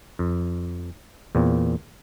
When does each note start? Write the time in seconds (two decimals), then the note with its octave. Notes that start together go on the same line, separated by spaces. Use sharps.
0.19 F2
1.35 E2 A#2 C4